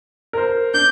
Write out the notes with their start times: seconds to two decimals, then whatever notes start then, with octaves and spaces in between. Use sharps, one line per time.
0.33 A#4 C5
0.74 D4 G6